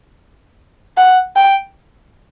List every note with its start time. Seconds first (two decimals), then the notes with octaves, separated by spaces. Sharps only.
0.97 F#5
1.36 G5